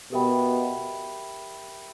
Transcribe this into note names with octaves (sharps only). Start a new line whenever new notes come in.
B2 G4 A#4 E5 G5 B5